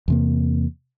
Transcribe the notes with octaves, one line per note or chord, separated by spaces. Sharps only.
E2 C3 A#3